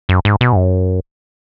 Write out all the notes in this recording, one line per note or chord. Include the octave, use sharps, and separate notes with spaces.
F#2
G#2
B2
G#2
F#2